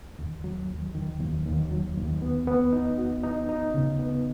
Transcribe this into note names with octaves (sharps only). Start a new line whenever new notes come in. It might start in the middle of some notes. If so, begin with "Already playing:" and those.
D#2
F#3
D#2
D#3
D#2
D#2
F#3
D#2
B3
B3
D#4
F#4
D#4
D#4
C#3
B3